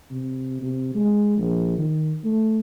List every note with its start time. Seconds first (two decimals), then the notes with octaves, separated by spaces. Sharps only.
0.11 C3
0.61 C3
0.94 G#3
1.37 A#1
1.78 D#3
2.24 A3